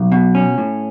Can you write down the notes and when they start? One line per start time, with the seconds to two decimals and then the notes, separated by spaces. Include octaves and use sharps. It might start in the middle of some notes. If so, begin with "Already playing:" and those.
Already playing: B1
0.12 B2
0.35 C#4
0.58 A2